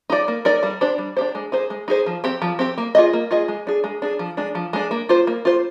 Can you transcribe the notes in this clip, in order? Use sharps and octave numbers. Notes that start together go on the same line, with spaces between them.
D#4 A#4 D5
A#3
D#4 A#4 D5
G3
D4 G4 C5
G3
D4 G4 C5
G#3
D#4 G#4 C5
G#3
D#4 G#4 C5
F3
C4 G4
F3
C4 G4
A#3
F4 G#4 D#5
A#3
F4 G#4 D#5
G#3
D4 G#4
G#3
D4 G#4
F3
G#3 D4
F3
G#3 D4
A#3
F4 C5
A#3
F4 C5